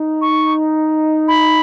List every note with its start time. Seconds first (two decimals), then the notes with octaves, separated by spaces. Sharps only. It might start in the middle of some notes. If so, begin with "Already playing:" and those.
Already playing: D#4
0.22 C#6
1.28 B5